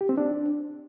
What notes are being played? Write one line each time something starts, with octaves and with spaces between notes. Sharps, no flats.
G4
C4
D4